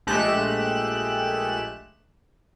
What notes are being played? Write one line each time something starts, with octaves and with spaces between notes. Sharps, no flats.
A#1 G#3 A3 G4 F#6 E7